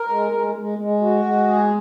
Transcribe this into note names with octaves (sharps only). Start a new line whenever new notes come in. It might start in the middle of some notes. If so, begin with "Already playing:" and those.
Already playing: A#4
G#3
G#3
G#3
G#3
F#4
G#3
G#4